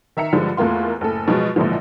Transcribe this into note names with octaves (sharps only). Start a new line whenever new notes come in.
D#3 E5 A#5 C#7
G2 D3 F3 G#3
E2 A3 A#3 F4 C6
F#1 A2 A4
B2 F3 F#3 G#3
A#1 G#2 B2 D3 E3 F3